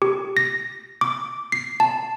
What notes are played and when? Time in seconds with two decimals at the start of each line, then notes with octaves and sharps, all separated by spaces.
0.02 G4
0.37 A#6
1.01 D6
1.52 C7
1.80 A5